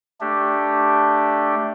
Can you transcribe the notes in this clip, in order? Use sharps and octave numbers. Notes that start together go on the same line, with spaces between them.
A3 D4 G4